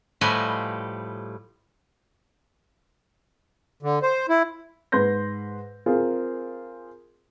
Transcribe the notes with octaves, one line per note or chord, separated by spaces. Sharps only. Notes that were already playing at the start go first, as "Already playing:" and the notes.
A2 F3 G3 B4 D#5 G#5
D3
C5
E4
G#2 B4 C6 G6 A#6
C4 F4 G#4 A#4